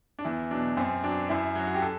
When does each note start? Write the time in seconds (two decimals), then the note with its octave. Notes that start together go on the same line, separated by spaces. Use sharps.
0.19 D4
0.24 E2 E4
0.51 B2 F#3 D4
0.77 F#2 C4
1.04 F#3 D4
1.29 F#2 E4
1.55 F#3 F#4
1.67 F#4
1.75 G4
1.82 A4